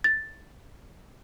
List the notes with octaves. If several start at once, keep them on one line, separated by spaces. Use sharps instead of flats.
A6